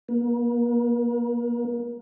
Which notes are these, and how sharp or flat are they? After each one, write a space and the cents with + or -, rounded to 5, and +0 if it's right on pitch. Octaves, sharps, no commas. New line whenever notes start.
A#3 +35